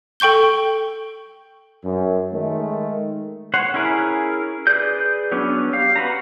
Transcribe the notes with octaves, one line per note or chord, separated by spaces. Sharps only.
A4 G5 C#6 G6 G7
F#2
D#3 G#3 A3
C5 C#5 F#5
C#4 E4 G#4 A#4
G#4 B4 D5 G6
F#3 B3 C#4 D4
G4 F5
F#4 B4 A#5